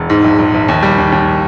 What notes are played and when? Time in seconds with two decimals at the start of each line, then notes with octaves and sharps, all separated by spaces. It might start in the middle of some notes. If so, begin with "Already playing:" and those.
Already playing: E1
0.10 G#2
0.24 A#1
0.39 A#1
0.54 A#1
0.68 D#2
0.83 G3
0.98 D#2
1.12 D#2